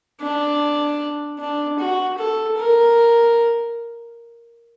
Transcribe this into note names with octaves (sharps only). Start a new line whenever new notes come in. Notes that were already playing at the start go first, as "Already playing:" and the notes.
D4
D4
F#4
A4
A#4